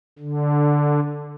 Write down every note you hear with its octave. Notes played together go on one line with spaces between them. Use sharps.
D3